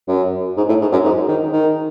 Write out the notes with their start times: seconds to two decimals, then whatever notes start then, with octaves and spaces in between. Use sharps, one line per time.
0.08 F#2
0.57 G#2
0.69 A2
0.81 G#2
0.92 F#2
1.04 G#2
1.28 D#3
1.52 D#3